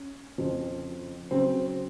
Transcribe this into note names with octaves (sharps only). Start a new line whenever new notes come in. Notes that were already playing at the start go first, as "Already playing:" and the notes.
Already playing: C#4
F2 C#3 F3 C4
C#3 F#3 C4